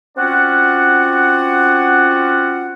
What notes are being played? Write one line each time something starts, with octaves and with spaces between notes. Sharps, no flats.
C4 C#4 F4 F#4 D5 F#5